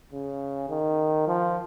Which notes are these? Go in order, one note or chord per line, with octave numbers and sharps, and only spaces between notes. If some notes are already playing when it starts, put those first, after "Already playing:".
C#3
D#3
F3